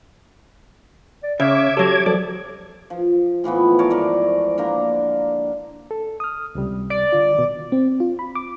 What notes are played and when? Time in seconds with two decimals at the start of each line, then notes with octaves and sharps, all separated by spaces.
1.23 D5
1.40 C#3 C#5 E5 D6 G#6
1.77 F#3 G4 A4
2.06 F3 F#3 A4 D5
2.90 F3
3.44 A2 E3 F3 B3
3.79 A#4 C#5 A5
3.90 G#2 A3 A#4 D5
4.58 D3 A#3 A#5
5.91 A4
6.20 D#6 F6
6.55 C#2 C3 G3
6.90 D5
7.12 D3 F4
7.35 B2 D#3
7.72 C4
8.00 F4
8.19 B5
8.35 D6